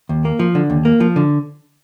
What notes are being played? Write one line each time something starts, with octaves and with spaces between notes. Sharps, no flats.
D#2
A#3
F3
D3
D#2
A#3
F3
D3